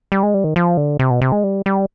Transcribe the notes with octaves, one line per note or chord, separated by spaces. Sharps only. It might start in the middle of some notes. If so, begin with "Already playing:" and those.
G3
G#3
G3
D#3
F3
D3
C3
B2
C3
G#3
G3
G3